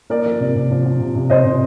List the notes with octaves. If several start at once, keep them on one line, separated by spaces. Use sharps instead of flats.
A#3 A#4 D5
F3
C3
C3
F3
F3
C3
C3
C3 C5 D#5
C3